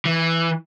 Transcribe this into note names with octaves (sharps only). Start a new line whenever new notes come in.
E3